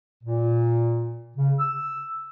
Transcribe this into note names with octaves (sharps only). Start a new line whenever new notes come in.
A#2
C#3
E6